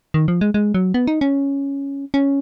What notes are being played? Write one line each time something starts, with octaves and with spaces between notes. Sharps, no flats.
D#3
F3
G#3
G#3
F#3
B3
D#4
C#4
C#4